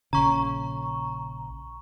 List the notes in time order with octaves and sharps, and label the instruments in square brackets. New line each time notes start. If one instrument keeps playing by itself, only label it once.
[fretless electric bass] A#1 C#3 [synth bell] A#5 C#6